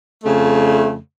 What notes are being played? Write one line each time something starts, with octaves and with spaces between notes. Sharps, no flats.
F2 C#3 A3